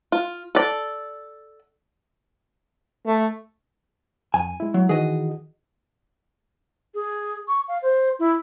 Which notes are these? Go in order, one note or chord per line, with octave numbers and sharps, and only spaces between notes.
F4
A4 D5
A3
F2 G#5
G#3 E4
F#3
D#3 E3 F#4 G#4 D#5
G#4
C#6
F5
C5
E4